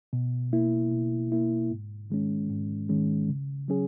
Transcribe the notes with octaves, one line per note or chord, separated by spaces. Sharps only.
B2
A#3 E4
B2
A#3 E4
G#2
D#3 G#3 C#4
G#2
D#3 G#3 C#4
C#3
F#3 C#4 G#4